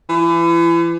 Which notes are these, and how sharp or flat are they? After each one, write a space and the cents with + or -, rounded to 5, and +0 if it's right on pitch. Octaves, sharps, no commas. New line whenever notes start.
E3 +35